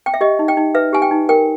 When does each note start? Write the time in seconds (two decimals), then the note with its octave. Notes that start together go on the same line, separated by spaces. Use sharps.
0.06 G5
0.14 E5
0.21 G4 D#5
0.39 D#4
0.48 G5
0.57 D#4
0.75 B4 E5
0.93 G4 G#5
1.02 G5
1.11 D#4
1.29 A#4 G5